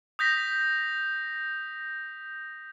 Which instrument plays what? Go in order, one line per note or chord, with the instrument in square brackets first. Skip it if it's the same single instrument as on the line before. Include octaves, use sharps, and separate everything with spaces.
[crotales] D#6 G6 A#6 B6